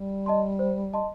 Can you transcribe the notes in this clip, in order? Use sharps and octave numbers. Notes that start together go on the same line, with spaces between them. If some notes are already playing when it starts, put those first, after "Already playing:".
Already playing: G3
D#5 A5 C6
C5
D#5 A5 C6